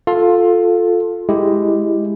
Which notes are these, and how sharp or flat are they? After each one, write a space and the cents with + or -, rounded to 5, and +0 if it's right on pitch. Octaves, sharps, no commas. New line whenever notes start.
F4 +15 A4 +0
G#3 +0 E4 +0 G4 +0